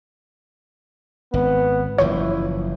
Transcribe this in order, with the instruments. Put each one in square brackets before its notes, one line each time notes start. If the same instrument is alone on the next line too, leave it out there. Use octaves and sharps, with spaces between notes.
[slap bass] G#1 [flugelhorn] B3
[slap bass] F#1 E3 F3 [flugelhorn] E4 [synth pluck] C#5